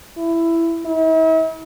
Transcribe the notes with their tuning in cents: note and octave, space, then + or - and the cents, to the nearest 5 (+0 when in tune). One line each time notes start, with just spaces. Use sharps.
E4 +10
E4 -45